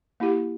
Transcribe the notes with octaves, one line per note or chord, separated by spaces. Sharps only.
A#3 E4 G4